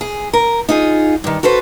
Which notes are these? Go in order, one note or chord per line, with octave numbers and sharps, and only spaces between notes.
G#4
A#4
D#4 F4 G#4
G2 D#3
F#4 A4 B4 C5